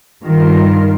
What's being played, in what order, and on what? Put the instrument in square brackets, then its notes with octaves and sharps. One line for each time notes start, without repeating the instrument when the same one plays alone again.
[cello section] G2 D#3 G3 F4 A#4